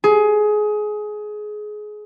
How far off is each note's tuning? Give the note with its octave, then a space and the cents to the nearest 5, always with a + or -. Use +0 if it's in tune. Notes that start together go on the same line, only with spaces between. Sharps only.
G#4 +20